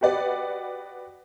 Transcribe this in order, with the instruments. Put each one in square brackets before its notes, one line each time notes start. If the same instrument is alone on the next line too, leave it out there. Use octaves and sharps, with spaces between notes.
[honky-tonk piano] F#4 G4 B4 D5 D#5 F#5